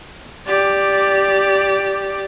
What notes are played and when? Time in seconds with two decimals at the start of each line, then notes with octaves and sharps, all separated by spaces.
0.47 G4 D5